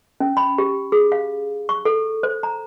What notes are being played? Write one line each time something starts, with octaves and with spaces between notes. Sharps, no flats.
C#4
B5
G4
G#4
F5
C#6
A4
C5
A#5